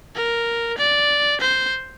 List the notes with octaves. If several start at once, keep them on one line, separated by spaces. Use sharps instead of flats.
A#4
D5
C5